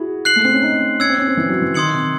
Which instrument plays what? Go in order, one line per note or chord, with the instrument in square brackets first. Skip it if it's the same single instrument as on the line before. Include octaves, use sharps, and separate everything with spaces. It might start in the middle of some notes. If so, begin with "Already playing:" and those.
Already playing: [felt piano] E4 F#4 G#4
[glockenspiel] F#6 C7 F#7
[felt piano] A3
C4
C#4
D#4
[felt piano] C#4 [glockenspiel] E6 G#6 C#7
[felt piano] C4
C#4
C4
E3
F#3
E3
[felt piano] D#3 [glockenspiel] C6 D#6 G#6 C#7 F#7
[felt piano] C3